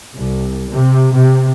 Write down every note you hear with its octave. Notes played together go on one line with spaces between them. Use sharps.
C2
C3
C3